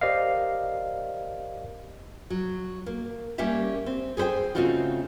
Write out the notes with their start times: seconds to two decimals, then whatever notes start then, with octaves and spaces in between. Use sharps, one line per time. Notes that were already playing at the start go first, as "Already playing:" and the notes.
0.01 G4 A#4 C5 D5 D#5 F5
2.30 F#3
2.86 A#3
3.38 G3 A#3 C#4 G4 E5
3.86 C4
4.17 G#4 A4 B4 C5 G5
4.55 C#3 A3 C4 D#4 F4 F#4